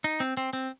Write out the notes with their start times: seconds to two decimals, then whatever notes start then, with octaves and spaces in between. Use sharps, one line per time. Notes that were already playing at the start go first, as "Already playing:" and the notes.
0.04 D#4
0.20 C4
0.37 C4
0.53 C4